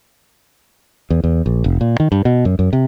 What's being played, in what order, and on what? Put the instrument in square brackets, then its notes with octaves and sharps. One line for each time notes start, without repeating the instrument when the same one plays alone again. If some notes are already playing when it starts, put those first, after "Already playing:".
[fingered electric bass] E2
E2
A#1
F1
A#2
D#3
G2
B2
F#2
F#2
C3